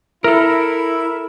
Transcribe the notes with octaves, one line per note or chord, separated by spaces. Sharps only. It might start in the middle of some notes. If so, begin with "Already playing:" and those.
E4 A4 A#4